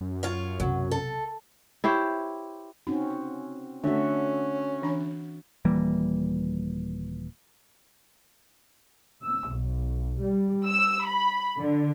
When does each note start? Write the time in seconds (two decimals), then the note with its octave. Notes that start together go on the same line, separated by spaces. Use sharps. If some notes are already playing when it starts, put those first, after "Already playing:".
0.01 F#2
0.23 F4 C#5 F5
0.60 B1 C3 F#3
0.91 A4
1.84 E4 G4 C5 C#5
2.87 C4 C#4 D#4 F#4
3.84 D3 A3 C#4 F#4 E5
4.82 E3 D4 A#5
5.65 D#1 E3 G3 A#3
9.23 E6
9.52 B1
10.20 G3
10.67 E6
11.05 B5
11.58 D3